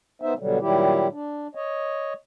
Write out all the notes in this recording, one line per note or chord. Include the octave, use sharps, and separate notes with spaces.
B3 D#4 C5 E5
B2 D3 F#3 G3
A#2 D#3 F#3 G3 E4 G4
D4
C#5 D#5